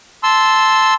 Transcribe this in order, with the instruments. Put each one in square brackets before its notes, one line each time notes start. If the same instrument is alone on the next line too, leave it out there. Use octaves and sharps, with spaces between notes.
[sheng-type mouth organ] A5 C6 E6